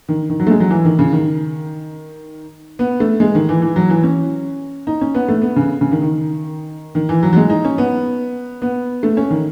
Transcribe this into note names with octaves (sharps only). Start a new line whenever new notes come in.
D#3
D#3
F#3
A3
G#3
F#3
E3
D#3
C#3
D#3
B3
A3
G#3
D#3
E3
E3
F#3
E3
C#4
D#4
C#4
B3
A3
B3
C#3
C#3
D#3
D#3
D#3
E3
F#3
F#3
G#3
D#4
C#4
B3
B3
A3
C#4
D#3